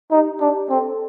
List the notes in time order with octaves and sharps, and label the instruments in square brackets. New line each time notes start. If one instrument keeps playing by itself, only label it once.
[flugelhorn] D#4 [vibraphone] G4
[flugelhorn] D4 [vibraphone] G4
[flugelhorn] C4 [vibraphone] A4